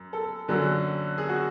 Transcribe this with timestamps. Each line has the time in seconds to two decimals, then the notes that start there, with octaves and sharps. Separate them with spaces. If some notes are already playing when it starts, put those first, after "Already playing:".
Already playing: F#2
0.13 A4
0.48 F#2 D3 F#3
1.18 G#4
1.29 F#4